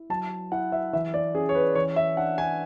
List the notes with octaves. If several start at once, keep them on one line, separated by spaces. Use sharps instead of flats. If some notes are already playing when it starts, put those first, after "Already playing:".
Already playing: E4
F#3 A5
E4 F#5
E5
E3 E5
D5
C#4 G#4
C#5
B4
E3 C#5
E5
D4 F#5
G#5